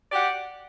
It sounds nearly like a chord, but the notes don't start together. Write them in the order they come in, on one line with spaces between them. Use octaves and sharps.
D5 G4 F#5